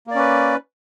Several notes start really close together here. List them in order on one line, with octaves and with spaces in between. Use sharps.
A#3 D5 C#4 B4